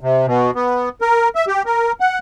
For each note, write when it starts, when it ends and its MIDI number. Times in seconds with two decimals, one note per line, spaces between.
0.01 0.26 48
0.27 0.51 47
0.55 0.89 59
1.01 1.29 70
1.35 1.45 76
1.48 1.63 67
1.66 1.92 70
2.00 2.19 78